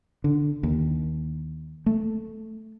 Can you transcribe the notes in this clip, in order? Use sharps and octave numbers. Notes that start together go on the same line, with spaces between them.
D3
D#2
A3